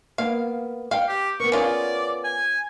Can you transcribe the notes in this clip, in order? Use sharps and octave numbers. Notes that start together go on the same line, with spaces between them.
A#3 B3 F5
F5 G5
G4
B3 A#4 C#6
C#4 F4 G#4 D5
G#5